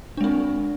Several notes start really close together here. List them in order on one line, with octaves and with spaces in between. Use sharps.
D4 G#3 C4